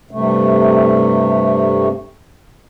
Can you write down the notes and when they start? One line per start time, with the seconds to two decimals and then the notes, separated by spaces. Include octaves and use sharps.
0.11 G2 C3 A3